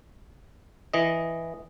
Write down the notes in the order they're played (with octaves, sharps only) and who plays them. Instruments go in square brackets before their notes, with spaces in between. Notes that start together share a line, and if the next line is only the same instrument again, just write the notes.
[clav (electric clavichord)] E3 D#5